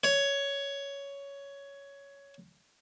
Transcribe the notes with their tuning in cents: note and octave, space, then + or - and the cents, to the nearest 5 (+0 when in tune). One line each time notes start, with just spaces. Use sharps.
C#5 +10